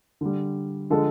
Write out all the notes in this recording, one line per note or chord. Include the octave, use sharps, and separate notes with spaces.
D3 G3
D3 F3 G#3 A4